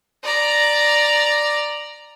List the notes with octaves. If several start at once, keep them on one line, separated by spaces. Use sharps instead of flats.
D5 A#5